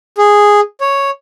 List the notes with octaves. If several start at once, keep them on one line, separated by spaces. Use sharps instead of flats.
G#4
C#5